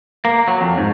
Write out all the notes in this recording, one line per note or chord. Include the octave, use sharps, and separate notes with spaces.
A#3
F#3
F2
G#2